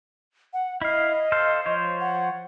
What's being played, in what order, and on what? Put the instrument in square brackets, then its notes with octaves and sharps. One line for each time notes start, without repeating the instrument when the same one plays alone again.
[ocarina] F#5
[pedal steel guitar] E4 F5 [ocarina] D#5
[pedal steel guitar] A4 C5 F5
F3 C5 C#5
[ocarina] F#5